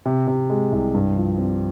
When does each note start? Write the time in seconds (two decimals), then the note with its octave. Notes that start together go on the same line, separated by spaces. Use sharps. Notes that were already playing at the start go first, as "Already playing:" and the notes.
0.05 C3
0.27 C3
0.50 G#3
0.72 C2
0.94 G2
1.17 F3
1.38 C4